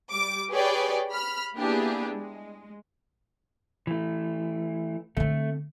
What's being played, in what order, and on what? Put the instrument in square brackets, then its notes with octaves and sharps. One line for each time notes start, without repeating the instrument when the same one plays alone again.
[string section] G3 D6
G4 G#4 B4 C#5 D5 G5
B5 F6
A#3 B3 D4 E4 G4 G#4
G#3
[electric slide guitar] E3 A3
[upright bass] D3 C4 [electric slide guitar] A3